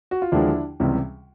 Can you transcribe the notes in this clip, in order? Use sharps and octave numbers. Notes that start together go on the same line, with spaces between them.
F#4
F4
D#2 D3 F3 G#3 D4 E4
C#2 C3 E3 G3